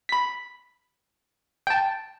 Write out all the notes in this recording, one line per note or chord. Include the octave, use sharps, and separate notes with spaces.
B5 B6
G5 A5